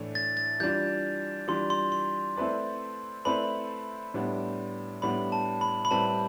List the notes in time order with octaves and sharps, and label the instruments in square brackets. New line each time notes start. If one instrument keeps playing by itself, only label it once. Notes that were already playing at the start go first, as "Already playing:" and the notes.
Already playing: [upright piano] A2 E3 A3 D4
[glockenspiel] A6
A6
[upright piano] E3 G3 D4 F4 [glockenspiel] G6
[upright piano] E3 G3 D4 F4 [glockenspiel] C6
[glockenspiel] C6
C6
[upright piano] A3 C4 E4 B4 D5
[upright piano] A3 C4 E4 B4 D5 [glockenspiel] B5
[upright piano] A2 G3 B3 D4
[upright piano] A2 G3 B3 D4 [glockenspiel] B5
[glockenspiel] A5
B5
B5
[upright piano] A2 G3 C4 G4 B4 [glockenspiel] A5